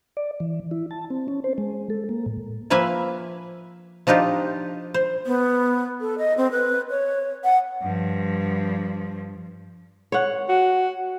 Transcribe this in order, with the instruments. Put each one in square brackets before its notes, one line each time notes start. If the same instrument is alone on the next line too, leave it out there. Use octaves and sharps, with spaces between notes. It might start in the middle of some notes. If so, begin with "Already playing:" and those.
[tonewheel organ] D5
E3
E4
A5
C4
C#4
C5
G#3
A4
A#3
A2
[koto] F3 A#3 B4 E5 G#5
F3 D4 D#4 F4 G4
C5
[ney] B3
A4
D#5
C4
B4
C#5
F#5
[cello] G2 F3
[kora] C#5 F#5
[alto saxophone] F#4